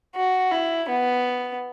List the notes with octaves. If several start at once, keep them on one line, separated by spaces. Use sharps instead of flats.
F#4
E4
B3